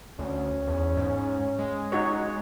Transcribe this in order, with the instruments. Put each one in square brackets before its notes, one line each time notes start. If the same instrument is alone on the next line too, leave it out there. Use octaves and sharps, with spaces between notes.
[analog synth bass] D2 [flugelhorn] C#4
[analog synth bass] E2
G#2
G#3
[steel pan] D#4 F#4 C#5